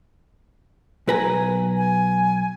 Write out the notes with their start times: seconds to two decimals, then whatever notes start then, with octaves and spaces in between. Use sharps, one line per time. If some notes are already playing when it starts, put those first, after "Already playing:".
1.07 B1 B4 G#5 A#5
1.77 G#5